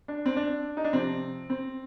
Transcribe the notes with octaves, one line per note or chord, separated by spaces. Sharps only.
D4
C4
D4
D#4
D4
C3 F3 C4
C4